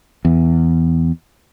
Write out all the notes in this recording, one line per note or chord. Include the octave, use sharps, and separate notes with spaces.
E2